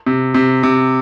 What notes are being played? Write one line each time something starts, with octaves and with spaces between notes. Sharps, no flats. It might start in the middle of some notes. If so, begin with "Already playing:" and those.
C3
C3
C3